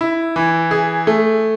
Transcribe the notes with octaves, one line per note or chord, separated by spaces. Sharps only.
E4
E3
G#4
A3